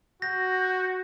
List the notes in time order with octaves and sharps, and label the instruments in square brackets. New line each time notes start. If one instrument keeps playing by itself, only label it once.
[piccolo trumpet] F#4 [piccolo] G6 [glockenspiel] A#6